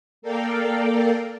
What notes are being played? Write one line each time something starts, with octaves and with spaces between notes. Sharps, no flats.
A#3 A4 A#4 D5 F5 G5